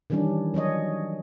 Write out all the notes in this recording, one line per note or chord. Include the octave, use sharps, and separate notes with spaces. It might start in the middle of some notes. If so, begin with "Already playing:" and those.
D#3 E3 G3 C#4 D4
F#3 C#4 C#5 D#5